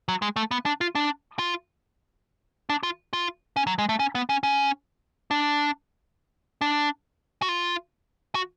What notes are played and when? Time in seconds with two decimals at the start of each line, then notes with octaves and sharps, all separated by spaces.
0.08 F#3
0.22 G#3
0.36 A3
0.51 B3
0.66 D4
0.81 F4
0.95 D4
1.39 F4
2.70 D4
2.83 F4
3.13 F4
3.56 C#4
3.67 F#3
3.78 G#3
3.89 A3
3.99 C#4
4.15 B3
4.29 C#4
4.43 C#4
5.31 D4
6.61 D4
7.42 F#4
7.49 F4
8.35 F#4